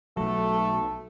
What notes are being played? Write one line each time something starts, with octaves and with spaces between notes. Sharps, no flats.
B1 F#3 A3 A4